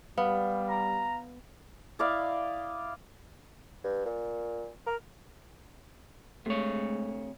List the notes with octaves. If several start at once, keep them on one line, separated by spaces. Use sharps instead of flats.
G3 B3 F5
A#5
E4 D5 D#5 F5
G2
A#2
A#4
C3 G#3 A3 C#5